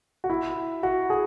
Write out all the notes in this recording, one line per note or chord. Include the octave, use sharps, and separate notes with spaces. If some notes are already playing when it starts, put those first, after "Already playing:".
F#4
E4
F#4
G#4